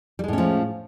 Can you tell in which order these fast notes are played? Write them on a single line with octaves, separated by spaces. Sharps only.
G3 G#3 A2 C#4 F3